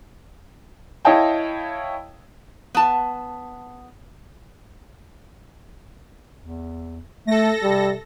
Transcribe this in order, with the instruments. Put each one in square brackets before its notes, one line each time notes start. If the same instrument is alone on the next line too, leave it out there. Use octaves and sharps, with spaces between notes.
[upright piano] E4 C#5 D#5 F5 G5 A5
[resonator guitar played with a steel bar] B3 A5
[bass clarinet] E2
[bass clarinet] A3 [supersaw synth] A4 A#6
[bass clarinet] C3 [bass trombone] G3